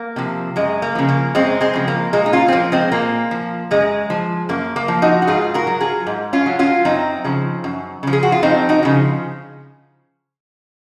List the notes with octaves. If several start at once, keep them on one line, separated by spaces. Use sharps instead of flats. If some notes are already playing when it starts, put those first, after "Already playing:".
Already playing: A#3
C3 F3
F#2 G#3
A#3
C#3 F3
A#3
F#2 G#3 C4
G#3 C4
C#3 F3
A#3
A#2 G#3
D#4
C#4 F4
C4
F3 A#3
G#3 C4
A#2 A#3
F3
F#2 G#3
F3
F#2 A#3
A#3
F3
D#4 F#4
F#4
G#2 F4 G#4
F#4 A#4
F#3
F4 G#4
G#2
C#4 F4
F#3
C#4 F4
F#2 C4 D#4
C#3 F3
F#2
C#3 F3
G#4
F#4
F4
F2 C4 D#4
D#4 F#4
C#3 F3